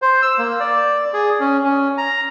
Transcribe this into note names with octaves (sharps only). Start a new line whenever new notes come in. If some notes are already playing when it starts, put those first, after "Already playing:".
C5
E6
A#3
D5
G#4
C#4
C#4
A#5